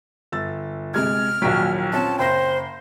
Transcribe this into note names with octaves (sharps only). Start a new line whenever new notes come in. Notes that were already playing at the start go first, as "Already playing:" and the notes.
G1 E6 A6
C3 G#3 F6 G#6
A#1 D#2 F#3 C#6 B6 D7
C4 C#4 F4 A5
F#1 C5 G5 A#6